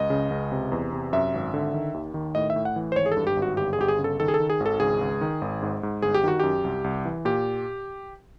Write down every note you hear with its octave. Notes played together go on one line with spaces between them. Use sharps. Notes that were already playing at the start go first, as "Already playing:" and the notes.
Already playing: C#2 D#5
C#3
C#2
C3
E2
C3
F#2 E5
G#1
D3
D#3
D#2
D#3
A2 D#5
E5
A2
F#5
E3
C5
G#1 C#5
G#4
G2 A4
G4
G#1
F#4
G1 G4
G#4
G1 G4
G#4
C#3
A4
D#3 A4
G#4
A4
D#3
G#4
G#1
A4
C#2 G#4
C#2
D#3
G#1
G#2
G#2
G1 G#4
G4
D#3 F#4
F#2 G4
C2
C2
E3
A#2 G4